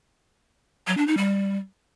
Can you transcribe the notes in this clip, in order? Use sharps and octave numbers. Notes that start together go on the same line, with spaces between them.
F#3
D4
D#4
G3